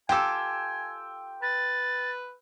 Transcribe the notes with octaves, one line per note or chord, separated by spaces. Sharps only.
F4 G4 A4 G5 G#5 E6
B4 A6